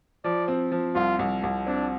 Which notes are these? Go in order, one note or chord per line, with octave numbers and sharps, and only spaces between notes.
F3 D5
C4
F3
C2 F4
C2
C2
C4 D4